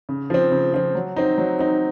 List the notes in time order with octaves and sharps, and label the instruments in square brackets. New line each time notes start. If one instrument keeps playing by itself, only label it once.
[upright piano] C#3
F3 C4
C#3
F3 C4
F#3
C4 D#4
F#3
C4 D#4